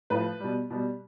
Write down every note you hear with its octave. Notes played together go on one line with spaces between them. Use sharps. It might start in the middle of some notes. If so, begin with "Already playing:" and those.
A2 F3 B4
B2 G3
B2 G3